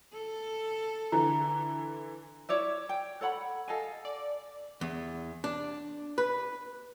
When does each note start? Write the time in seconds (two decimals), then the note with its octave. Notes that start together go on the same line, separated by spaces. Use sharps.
0.13 A4
1.12 D3 E3 A#5
2.49 E4 C#5 D5 E5
2.89 G5
3.21 A4 C#5 F#5 B5
3.68 A4 D#5 F5 G#5
4.05 D5
4.81 E2
5.44 D4
6.18 B4